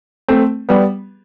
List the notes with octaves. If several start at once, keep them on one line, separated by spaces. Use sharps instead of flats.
A3 C4
G3 B3